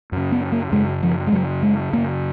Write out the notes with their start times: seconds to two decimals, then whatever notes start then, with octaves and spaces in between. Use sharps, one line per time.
0.12 F#2 C#3
0.32 B3
0.52 A#3
0.72 F#2 C#3 G#3
1.03 F3
1.27 G#3
1.32 F#2 C#3 F#3
1.63 G#3
1.93 F#2 C#3 A#3